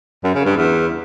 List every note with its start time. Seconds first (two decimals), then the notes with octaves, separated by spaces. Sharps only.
0.24 F#2
0.35 C#3
0.45 G2
0.56 E2